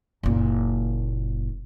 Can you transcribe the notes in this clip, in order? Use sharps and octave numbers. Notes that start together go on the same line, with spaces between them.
F#1 A#2